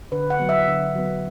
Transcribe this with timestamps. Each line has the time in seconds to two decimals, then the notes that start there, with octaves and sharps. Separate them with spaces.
0.12 D3 B4
0.30 F#5
0.40 F#3 B3
0.49 E5
0.68 D3
0.95 F#3 B3